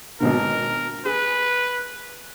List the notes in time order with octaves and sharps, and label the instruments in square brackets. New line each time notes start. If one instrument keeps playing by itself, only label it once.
[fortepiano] G#1 B2 D3 [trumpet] A#4
[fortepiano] G#4 [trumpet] B4